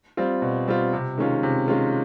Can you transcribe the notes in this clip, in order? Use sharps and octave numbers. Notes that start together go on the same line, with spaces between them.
G3 C4 F4
B2
G3 C4 F4
C3
D#3 G#3 C#4 F4
C3
D#3 G#3 C#4 F4